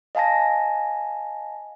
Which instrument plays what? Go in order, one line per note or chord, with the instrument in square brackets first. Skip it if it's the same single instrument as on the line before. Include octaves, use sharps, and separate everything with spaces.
[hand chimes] D#5 F5 G#5 A5 A#6